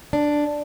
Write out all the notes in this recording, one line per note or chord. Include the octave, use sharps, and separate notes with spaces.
D4